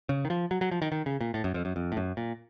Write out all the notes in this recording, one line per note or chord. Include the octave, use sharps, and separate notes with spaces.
C#3
D#3
F3
F#3
F#3
F3
D#3
D#3
C#3
A#2
A2
F#2
F2
F#2
F2
A2
F#2
A#2